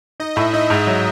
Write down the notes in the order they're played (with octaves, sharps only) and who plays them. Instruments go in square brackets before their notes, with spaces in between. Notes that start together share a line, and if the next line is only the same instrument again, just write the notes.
[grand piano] D#4 [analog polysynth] D#5
[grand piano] A2 [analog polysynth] E5
[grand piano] D#4 [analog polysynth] D#5
[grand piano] G#2 [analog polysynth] E5
[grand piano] F#3